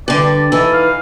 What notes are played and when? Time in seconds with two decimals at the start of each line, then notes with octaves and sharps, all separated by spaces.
0.08 G2 D3 D5
0.52 E3 D#4 A4
0.73 F5